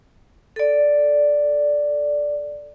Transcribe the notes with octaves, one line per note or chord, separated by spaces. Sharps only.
A4 D5